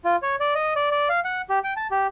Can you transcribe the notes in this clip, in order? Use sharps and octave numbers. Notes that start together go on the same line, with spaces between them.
F4
C#5
D5
D#5
D5
D5
F5
F#5
G4
G5
A5
G4